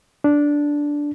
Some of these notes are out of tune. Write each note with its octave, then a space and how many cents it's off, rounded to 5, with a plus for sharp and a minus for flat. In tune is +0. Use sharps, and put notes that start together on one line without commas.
D4 -5